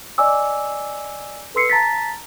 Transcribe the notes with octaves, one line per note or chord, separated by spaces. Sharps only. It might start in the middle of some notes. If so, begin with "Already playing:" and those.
D5 D#5 G#5 D6 E6
A4 B4 C6 E6 C7 C#7
A5 A#5 A6 B6